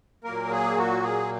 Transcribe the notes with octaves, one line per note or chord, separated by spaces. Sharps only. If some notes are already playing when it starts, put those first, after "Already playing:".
A#2 F#3 A#3 A#4
G#4
F#4
G#4